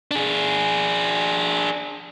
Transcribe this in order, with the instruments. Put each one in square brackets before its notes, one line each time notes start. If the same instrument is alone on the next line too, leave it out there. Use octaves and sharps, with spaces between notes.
[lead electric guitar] D4 G#4